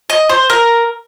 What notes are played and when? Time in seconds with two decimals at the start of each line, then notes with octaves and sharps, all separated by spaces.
0.10 D#5
0.29 C5
0.50 A#4